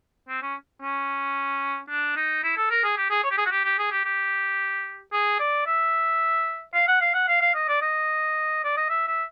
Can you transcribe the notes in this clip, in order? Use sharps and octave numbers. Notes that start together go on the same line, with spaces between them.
C4
C#4
C#4
D4
D#4
E4
A4
A#4
G#4
G4
G#4
C#5
G4
G#4
F#4
G4
G4
G#4
G4
G4
G#4
D5
E5
F5
F#5
F5
F#5
F5
F5
D#5
D5
D#5
D5
D#5
E5
E5